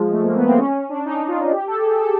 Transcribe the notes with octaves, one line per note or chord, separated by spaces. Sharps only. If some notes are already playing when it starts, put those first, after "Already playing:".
Already playing: F3 G#3
A3
A#3
B3
C4
C#4
C#4
D4
D#4
F4
G4
A4
G#4
A4